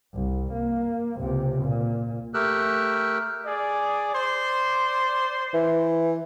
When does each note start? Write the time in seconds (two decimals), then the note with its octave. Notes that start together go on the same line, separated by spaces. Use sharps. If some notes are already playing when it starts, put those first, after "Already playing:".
0.14 C2
0.53 A#3
1.19 C#2 C3
1.64 A#2
2.34 A3 G4 A#4 E6 F#6
3.46 G#4 D5
4.13 C5 D5 C6
5.54 E3